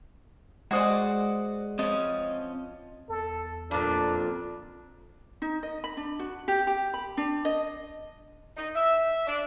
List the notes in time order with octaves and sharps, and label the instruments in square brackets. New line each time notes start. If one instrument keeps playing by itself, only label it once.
[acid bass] G#3 [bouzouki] F#4 C5 D5 [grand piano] F#5 D#6
[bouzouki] F3 C#4 [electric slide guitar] C4 D#5
[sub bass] E2 [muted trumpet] A4
[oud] F2 A#2 [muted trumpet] D4
[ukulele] D#4
D#5
B5
D4
F#4
G4
G4
B5
D4
D#5
[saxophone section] D#4
E5
D4